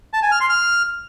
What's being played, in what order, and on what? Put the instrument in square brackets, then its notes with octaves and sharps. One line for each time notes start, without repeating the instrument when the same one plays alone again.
[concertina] A5
G#5
F6
C6
F6